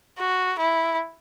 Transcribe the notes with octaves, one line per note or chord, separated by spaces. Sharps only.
F#4
E4